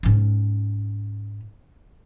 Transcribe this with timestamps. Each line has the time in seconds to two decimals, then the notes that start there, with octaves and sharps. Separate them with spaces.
0.03 G#2 C#4